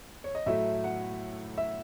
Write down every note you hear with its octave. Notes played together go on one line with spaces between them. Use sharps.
C#5
D#5
A2 F#3 A3 E4 E5
F#5
E5